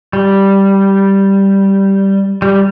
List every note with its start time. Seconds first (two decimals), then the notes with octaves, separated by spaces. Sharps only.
0.13 G3
2.42 G3